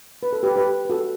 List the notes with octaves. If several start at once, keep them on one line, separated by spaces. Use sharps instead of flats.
B4
A4
G4 B4
G4 B4
B4
F#4 A4